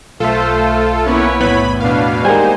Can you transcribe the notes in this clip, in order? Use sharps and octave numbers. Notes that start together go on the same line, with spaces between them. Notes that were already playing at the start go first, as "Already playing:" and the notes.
B1 A3 F4 A4 C5 E5
A#3 B3 C#4 E4 B4 C#5
E2 A2 B3 B5
B2 D4 B4 F5
G3 G#3 A#3 D#4 C5 G#5